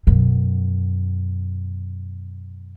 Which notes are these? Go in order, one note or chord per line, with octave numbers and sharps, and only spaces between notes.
F#2 B2